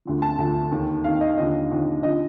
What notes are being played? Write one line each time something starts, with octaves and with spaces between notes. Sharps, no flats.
D2 D3 F3
A5
D2 D3 F3
D#2 D#3
D#2 D#3 F5
D#5
D#2 D3 F3 D#5
D#2 D3 F3
D3 F3 D#5